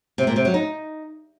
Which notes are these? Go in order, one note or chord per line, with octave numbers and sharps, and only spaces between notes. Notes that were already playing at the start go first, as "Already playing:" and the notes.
C3
A#2
C3
F#3
D#4